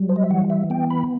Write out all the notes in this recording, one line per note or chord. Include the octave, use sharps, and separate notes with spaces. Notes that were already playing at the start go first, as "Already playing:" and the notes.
Already playing: F#3 G3
C5
D#5
E5
E3 F#5
E5
B3 G5
B5